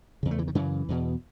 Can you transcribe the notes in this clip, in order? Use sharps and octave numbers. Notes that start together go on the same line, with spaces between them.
E2 C#3
A3
E3
D#3
F#2 C#3 E3
E2 B2